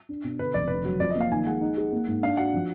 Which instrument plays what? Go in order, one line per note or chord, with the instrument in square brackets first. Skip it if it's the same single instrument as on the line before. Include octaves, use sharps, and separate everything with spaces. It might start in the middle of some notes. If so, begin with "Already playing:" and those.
[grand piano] D4
B2
[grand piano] D3 [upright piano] B4
[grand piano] F1 [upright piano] D5
[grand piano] D3 [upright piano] B4
[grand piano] F#3
[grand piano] F3 [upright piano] D5
[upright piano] D#5
[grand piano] A#3
[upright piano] F5
[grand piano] D#3 [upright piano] G#5
[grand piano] G#3 [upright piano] F#5
[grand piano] D#4
G#4
A#3
G#2
[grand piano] D4 [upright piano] F5
[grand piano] F#4 [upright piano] F#5
[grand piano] F3